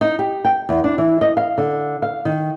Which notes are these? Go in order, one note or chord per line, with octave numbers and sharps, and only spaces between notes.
D#4
G4
G5
E2
D4
E3
D#5
F5
D3
F5
D#3